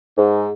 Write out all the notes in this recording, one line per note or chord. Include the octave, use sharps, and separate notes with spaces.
G#2